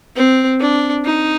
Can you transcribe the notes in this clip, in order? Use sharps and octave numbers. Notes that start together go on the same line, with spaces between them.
C4
D4
D#4